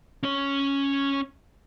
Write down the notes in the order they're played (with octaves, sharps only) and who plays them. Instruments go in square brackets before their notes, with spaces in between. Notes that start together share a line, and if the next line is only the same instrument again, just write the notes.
[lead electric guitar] C#4 C#5